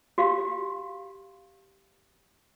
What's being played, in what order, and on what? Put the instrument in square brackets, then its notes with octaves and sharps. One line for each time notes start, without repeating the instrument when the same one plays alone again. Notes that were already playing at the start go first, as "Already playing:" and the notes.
[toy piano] F#4 G4 F5